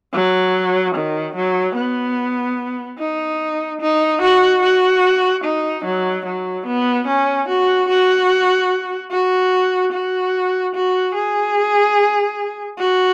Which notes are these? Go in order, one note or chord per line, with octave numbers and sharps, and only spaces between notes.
F#3
D#3
F#3
B3
D#4
D#4
F#4
F#4
D#4
F#3
F#3
B3
C#4
F#4
F#4
F#4
F#4
F#4
G#4
F#4